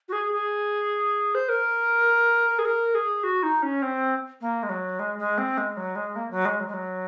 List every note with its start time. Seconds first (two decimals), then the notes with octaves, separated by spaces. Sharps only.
0.08 F#4
0.12 G#4
0.32 G#4
1.34 C5
1.49 A#4
2.58 G#4
2.65 A#4
2.94 G#4
3.23 F#4
3.43 D#4
3.62 C#4
3.82 C4
4.40 A#3
4.63 G#3
4.69 F#3
4.99 G#3
5.18 G#3
5.38 C4
5.57 G#3
5.77 F#3
5.95 G#3
6.15 A#3
6.30 F#3
6.45 G#3
6.60 F#3
6.68 G#3
6.73 F#3